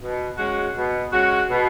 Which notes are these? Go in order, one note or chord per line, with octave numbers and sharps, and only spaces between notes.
B2
G#3 C#4 F#4
B2
G#3 C#4 F#4
B2